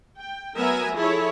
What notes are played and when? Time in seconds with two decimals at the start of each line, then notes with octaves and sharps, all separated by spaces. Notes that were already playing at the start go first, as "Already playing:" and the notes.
0.18 G5
0.57 F#3 B3 A#4 E5 G#5 A#5
0.94 F3 E4 G#4 A4 C#5